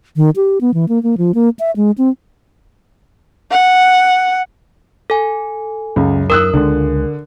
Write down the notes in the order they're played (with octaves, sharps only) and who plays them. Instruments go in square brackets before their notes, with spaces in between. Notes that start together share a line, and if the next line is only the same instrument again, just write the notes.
[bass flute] D#3
G4
B3
E3
A#3
A#3
F3
A#3
E5
G#3
C4
[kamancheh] F#5
[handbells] A4 G#5
[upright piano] C#2 [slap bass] F#2
[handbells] A#4 [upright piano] D#6 E6 F#6
[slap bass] C#2 G#3 [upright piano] D3